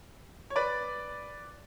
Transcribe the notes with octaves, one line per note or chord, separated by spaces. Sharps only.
C#5
B4 D5